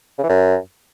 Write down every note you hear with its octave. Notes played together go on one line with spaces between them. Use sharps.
C#3
E3
F#2